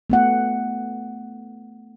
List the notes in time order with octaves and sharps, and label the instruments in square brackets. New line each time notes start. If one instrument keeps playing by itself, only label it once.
[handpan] A3 B3 F#5